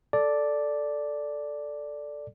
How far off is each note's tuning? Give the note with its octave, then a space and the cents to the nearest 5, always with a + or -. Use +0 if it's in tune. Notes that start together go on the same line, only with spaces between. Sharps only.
A4 +0 D5 +0